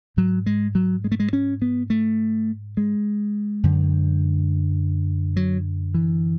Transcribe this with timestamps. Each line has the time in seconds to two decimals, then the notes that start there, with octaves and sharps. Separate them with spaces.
0.17 G#2 F#3
0.46 G#3
0.75 F#3
1.04 G#3
1.12 A3
1.20 G#3
1.33 C#4
1.62 B3
1.90 A3
2.77 G#3
3.63 F#2 D3
5.36 F#3
5.94 E3